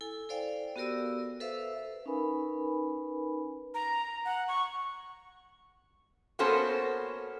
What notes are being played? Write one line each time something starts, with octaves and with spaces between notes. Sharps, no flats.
E4 A4 G#5
A4 C5 D5 F5 G5
B3 F#4 G4 A#4 D5 E6
A4 B4 C5 E5 F5 E6
C#4 D#4 A#4 B4 G#5 B5
A#5
F#5
C#6
A#3 B3 C#4 F#4 A4 C5